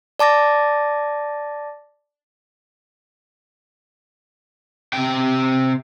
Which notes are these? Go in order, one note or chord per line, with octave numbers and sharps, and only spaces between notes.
D5 A5 D6 A6 A#6
C3 G5